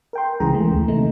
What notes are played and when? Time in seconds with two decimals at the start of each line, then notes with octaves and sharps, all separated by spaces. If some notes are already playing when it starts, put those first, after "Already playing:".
0.13 A#4 G5 C6
0.40 C2 C#3 E3 G#3 G#4 A#5
0.53 E3 A3
0.71 D#2
0.88 C3 D#3 E3 A3 D#4